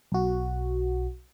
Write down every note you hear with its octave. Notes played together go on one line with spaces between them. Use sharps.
B1 F#4